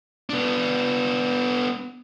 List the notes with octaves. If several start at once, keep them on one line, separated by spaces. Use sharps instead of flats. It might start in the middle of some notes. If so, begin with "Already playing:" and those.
B3 D4